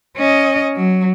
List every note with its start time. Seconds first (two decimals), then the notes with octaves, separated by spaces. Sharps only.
0.17 C#4 D#5
0.76 F#3